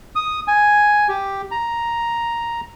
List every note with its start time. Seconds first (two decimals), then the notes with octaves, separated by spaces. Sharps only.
0.15 D#6
0.48 G#5
1.09 G4
1.51 A#5